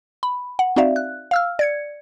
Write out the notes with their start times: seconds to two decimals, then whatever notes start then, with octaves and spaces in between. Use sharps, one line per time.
0.23 B5
0.59 F#5
0.76 C4 D#4 F#4 D5 E5 F5
0.96 F#6
1.31 F5 E6 F6
1.59 D5 G#6 C#7